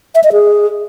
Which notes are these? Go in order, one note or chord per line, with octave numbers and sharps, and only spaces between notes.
E5
D#5
G#4